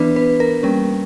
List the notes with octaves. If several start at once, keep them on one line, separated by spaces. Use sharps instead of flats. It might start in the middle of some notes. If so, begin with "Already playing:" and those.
Already playing: E3 B3 D4 B4
B4
A#4
G3 A#3 C#4 A#4